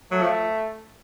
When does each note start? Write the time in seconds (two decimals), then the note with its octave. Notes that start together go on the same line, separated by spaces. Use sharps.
0.11 F#3 A3
0.21 F3